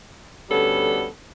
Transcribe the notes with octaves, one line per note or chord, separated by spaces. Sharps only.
D2 G3 B3 C#4 A4